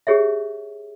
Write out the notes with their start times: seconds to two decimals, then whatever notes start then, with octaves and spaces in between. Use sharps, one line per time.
0.07 G4 G#4 C#5 E5